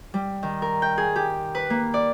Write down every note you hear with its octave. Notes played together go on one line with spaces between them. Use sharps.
G3
D#3
A#4
G5
G#4
G4
B4
A#3
D5